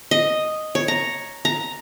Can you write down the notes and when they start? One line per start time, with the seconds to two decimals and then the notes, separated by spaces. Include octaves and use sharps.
0.11 D#5
0.75 C#5
0.88 A#5
1.45 A#5